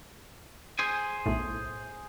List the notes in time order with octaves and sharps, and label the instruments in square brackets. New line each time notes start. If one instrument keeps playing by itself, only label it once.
[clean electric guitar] G#4 C5 G#5
[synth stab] B1 A2